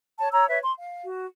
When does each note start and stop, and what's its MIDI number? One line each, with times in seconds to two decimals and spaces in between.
0.19 0.28 73
0.19 0.28 81
0.33 0.47 73
0.33 0.47 82
0.33 0.47 88
0.49 0.59 71
0.49 0.59 73
0.49 0.59 76
0.63 0.73 84
0.78 1.04 77
1.04 1.26 66